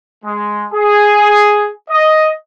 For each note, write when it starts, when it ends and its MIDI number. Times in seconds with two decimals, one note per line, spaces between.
0.25 0.65 56
0.73 1.71 68
1.90 2.33 75